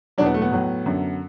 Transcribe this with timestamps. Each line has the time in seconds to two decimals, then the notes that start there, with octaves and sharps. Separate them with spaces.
0.18 E2 B2 F#3 D4
0.26 B3
0.34 A3
0.42 B3
0.52 A2 F#3
0.86 F#2 D3 F#3